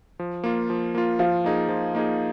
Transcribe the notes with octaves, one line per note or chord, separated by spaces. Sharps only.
F3
A#3 F4
F3
A#3 F4
F3 F4
A#3 D#4 G#4
F3
A#3 D#4 G#4